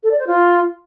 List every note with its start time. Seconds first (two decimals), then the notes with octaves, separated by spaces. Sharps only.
0.03 A4
0.11 D5
0.19 C5
0.27 F4